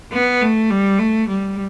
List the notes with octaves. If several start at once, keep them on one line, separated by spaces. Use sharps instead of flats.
B3
A3
G3
A3
G3